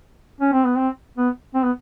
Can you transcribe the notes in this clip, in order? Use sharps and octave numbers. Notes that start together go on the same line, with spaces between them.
C#4
C4
B3
C4
B3
C4
B3